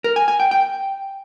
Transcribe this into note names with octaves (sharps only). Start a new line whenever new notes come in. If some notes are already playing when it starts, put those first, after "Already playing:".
A#4
G#5
G#5
G5
G5